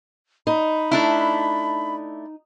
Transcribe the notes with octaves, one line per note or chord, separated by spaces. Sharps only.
D#4 B5
A3 D4 E4